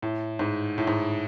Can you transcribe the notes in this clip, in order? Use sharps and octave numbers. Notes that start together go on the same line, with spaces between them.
A2
G#2
A2
G#2